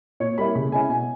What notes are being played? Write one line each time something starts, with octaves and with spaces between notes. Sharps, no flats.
A#2 C#5
G3 A#3 E4 B5
C#3 B5
G#3 C#4 E4 G#5
B2 G#5